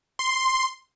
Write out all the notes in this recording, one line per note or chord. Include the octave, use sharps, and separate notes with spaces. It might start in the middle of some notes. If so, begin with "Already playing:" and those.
C6